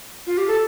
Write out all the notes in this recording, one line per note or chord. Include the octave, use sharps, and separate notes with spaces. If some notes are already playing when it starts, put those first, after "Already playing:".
F4
G4
A4